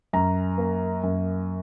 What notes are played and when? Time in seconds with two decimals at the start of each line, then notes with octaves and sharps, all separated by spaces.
0.13 F#2 A#5
0.58 A#3
1.03 F#2